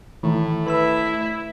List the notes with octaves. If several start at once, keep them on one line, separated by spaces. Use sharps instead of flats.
A2 D#3 E3
E4 B4 E5 B5 E6